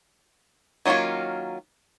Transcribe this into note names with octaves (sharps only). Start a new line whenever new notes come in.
D#3 F#3 A#3 C#4 F4